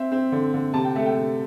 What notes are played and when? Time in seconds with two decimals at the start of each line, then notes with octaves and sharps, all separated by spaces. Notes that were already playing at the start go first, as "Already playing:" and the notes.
Already playing: C4 E5
0.12 C4
0.32 D3
0.54 D3
0.74 C3 A5
0.85 G5
0.96 A3 E5
1.06 G5
1.17 C3